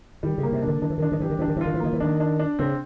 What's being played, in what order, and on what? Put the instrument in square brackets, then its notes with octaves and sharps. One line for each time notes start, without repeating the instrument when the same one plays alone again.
[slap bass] D#3 [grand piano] G3
[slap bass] C#3
[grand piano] A#3
[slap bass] C3
[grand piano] D4
[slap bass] D3
[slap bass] D#3 [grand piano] D4
[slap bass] E3
[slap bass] D#3 [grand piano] D4
[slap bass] D#3
[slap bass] E3 [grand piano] G4
[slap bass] D#3
[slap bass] E3 [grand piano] D4
[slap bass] D#3
E3
[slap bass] D#3 [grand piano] F4
[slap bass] E3
[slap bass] D#3 [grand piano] A#3
[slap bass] E3
[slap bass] D#3 [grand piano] D4
[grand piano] D4
D4
[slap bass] C#3 [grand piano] C4